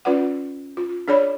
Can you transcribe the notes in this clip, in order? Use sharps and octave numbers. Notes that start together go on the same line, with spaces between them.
C#4 F4 B4 D5 F#5
F4
D4 G#4 C#5 D5 B5